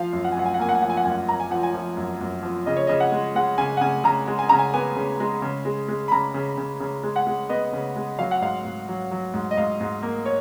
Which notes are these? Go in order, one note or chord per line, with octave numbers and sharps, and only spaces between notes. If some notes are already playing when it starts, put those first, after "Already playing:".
Already playing: F3 F5
F#2
F#5
G#5
F#2 F#5
G#5
F#5
A#3 G#5
F#5
G#5
F3 F#5
G#5
F#5
F#2 G#5
F#5
F#2 A#5
G#5
F3 F#5
G#5
F3
F#2
F#2
F3
C#3 D#5
C#5
C#3 D#5
F#5
G#3
G#3 F#5
C#3 G#5
F#5
C#3 G#5
C#3 A#5
G#3
G#5
C#3 A#5
G#5
B3 G#5
C#3
G#3
C#3
G#3
G#3
B5
C#3 A#5
C#3
C#3
C#3
G#3
F#5
G#3
B3 D#5
C#3
G#3
F#3 F5
F#5
G#2 F5
G#2
F#3
F#3
G#2
D#5
G#2 F5
G#2
A#3
C#5